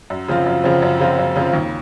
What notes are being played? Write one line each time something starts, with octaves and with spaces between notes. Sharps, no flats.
F#2
C#3 F3 C4 F4
F#2
C#3 F3 C4 F4
F#2
C#3 F3 C4 F4
F#2
C#3 F3 C4 F4
D#2